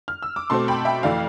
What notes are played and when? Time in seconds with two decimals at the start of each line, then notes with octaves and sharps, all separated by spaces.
0.08 F6
0.22 E6
0.36 D6
0.50 B2 A3 C4 A5 C6
0.68 G5 B5
0.85 E5 G5
1.03 F2 E3 A3 D5 F5